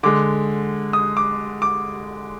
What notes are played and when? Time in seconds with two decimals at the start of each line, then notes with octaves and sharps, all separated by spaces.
0.03 D3 G#3 D6
0.93 D#6
1.17 D6
1.62 D6